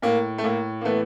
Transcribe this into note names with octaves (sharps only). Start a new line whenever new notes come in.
A2 A#3
A3
A2 A#3
A#3
E3 A3 B3